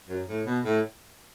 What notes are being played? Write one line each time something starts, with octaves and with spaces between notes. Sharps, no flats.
F#2
A2
B2
A2